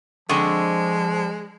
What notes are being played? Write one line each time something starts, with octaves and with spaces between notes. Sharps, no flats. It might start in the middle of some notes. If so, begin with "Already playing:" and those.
D3 F3 G#3 C4 D#5 C#6